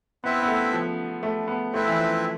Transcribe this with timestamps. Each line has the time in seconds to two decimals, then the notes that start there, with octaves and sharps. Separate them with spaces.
0.24 B3 C4 E4 B4 E5
0.42 B3
0.48 A3
0.73 F3
1.23 A3
1.48 B3
1.73 A3 C4 E4 B4 E5
1.88 E3
1.98 F3